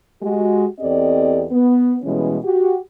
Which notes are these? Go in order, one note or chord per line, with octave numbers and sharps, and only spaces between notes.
G#3 F#4 G4
E2 C4 G4 A4 D5 D#5
B3
B2 E3 G3 G#3 C#4
F#4 G4